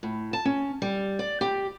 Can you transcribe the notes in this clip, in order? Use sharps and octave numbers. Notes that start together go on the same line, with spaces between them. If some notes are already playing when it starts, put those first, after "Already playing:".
A2
A5
C#4
G3
D5
G4